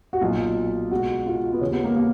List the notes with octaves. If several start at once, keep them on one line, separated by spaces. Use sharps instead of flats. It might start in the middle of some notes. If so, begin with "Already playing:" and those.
F#4
B1 A#2 F4
C#2 B2 F#4
F4
B3
D#2 C#3 C#4
B3
A#3
A#3